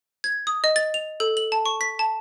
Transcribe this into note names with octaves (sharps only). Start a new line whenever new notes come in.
G#6
D#6
D#5
A6
F7
A4
F#7
A5
C#6
B6
A5